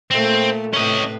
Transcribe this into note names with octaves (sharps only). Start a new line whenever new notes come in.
A#2 A3 C4
A2 C3 C#4 B4 D#5